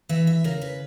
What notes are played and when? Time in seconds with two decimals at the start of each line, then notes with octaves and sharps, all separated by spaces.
0.09 E3 E5
0.27 E5
0.44 C#3 A#4
0.61 B4